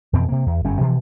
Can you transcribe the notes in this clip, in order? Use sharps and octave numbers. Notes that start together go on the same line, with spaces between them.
F2 B2 E3 C4
C3 A#3
E2
G1 F#2 G3 C#4
B2 E3 F3